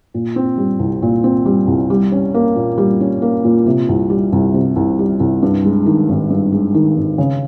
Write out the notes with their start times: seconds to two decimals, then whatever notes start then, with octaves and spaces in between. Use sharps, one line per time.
0.14 A#2
0.36 C4
0.57 G3
0.79 C2
1.02 A#2
1.24 C4
1.46 G3
1.67 C2
1.90 G3
2.12 C#4
2.34 A#3
2.56 A#2
2.78 G3
3.01 C#4
3.22 A#3
3.44 A#2
3.66 C3
3.89 C2
4.10 G3
4.32 C2
4.54 C3
4.76 C2
4.99 G3
5.20 C2
5.42 G2
5.65 G#3
5.86 D#3
6.09 G#1
6.30 G2
6.52 G#3
6.74 D#3
6.96 G#1
7.18 C#3